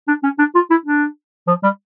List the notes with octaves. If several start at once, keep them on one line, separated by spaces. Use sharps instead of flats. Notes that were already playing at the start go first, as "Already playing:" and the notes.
D4
C#4
D4
F4
E4
D4
F3
G3